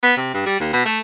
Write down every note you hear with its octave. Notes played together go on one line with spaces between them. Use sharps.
B3
C3
G2
G3
D#2
B2
A3